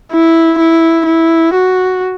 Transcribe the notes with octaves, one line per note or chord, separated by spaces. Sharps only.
E4
E4
E4
F#4